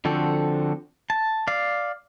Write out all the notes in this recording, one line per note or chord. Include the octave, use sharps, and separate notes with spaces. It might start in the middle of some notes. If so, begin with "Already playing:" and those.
D3 F3 C4 F#4 A4
A5
D5 F5